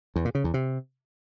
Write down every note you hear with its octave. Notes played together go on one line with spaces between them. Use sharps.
E2
A#2
C#3
E2
C3